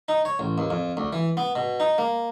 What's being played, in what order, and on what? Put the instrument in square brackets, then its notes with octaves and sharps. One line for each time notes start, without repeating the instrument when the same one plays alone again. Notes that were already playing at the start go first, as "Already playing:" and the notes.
[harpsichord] D#4
C#5
A1
D#2
F2
D2
E3
B3
B2
D#4
A#3